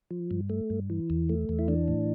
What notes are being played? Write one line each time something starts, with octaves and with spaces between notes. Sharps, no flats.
F3
G2
A3
G2
E3
E2
A3
E2
E4
E3 D4
A2